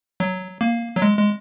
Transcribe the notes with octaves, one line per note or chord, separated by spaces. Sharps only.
F#3
A#3
F#3
G#3
G#3